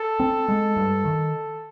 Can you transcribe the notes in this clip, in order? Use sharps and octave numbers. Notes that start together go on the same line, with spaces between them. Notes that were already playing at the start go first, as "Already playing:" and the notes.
Already playing: A4
C4
G#3
G2
D#3